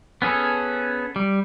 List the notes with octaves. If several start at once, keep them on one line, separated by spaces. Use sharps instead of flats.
B3 C#4 G#4 A4
G3